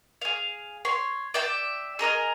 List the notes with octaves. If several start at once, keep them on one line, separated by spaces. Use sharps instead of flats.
G#4 F5
C#5 C6
D5 E5 G5
G#4 A#4 D#5 F6